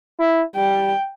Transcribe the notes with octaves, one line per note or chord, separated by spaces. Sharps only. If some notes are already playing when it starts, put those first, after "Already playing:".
E4
G3 G5